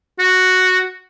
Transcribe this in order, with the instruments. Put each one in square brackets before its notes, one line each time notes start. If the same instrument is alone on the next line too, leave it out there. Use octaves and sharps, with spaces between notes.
[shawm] F#4